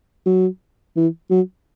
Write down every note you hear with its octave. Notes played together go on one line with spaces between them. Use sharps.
F#3
E3
F#3